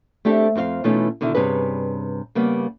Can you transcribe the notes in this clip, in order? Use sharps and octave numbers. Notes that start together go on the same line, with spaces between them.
A3 C4 D4 G4 A4
F2 C4 F#4 F5
B2 E3 A3 C#4 D#4 F4
B2 D3 D#3 E4
G2 C3 C#4 G#4 B4
C#3 G3 A#3 B3